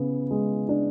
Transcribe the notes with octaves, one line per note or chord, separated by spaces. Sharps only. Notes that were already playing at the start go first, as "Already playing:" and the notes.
Already playing: C#3 B3
G#3
D4